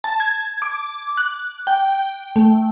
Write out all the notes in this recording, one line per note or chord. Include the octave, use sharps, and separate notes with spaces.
A5
G#6
D6
F#6
G5
A3